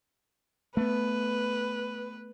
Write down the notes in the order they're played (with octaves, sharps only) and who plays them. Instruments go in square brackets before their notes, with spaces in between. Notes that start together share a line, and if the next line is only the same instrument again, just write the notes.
[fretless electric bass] A3 B3 [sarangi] B4